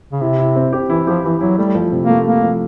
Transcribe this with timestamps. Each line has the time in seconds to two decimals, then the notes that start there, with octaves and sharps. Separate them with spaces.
0.12 C#3
0.21 C3 E4
0.39 E4
0.56 C4
0.73 G4
0.90 E3 E4
1.07 F3 G4
1.24 E3 E4
1.41 F#3 E4
1.58 G3 A3
1.75 F3
1.92 C3
2.04 A#3
2.10 A3
2.26 A3 A#3
2.43 F3